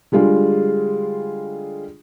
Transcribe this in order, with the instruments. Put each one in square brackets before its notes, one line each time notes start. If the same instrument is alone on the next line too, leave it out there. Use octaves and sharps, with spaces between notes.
[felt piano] D3 G3 G#3 F4 G#4